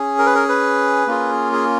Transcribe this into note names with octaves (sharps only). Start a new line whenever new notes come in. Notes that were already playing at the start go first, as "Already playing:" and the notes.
Already playing: C#4 G#4
A#4
B4
A#4
B4
A#3 C#4 F4 G#4
G#4